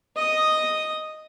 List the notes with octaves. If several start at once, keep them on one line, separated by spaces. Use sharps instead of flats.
D#5 D#6